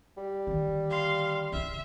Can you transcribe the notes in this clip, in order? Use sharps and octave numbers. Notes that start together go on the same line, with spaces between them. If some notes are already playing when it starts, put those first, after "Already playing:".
G3
D3 D#3
F5 C6
C#3 A#3 E5